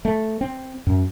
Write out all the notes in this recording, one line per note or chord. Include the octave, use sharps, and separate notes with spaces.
A3
C4
F#2